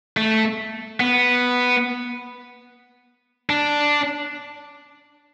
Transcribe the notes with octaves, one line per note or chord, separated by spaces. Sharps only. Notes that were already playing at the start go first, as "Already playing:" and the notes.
A3
B3
D4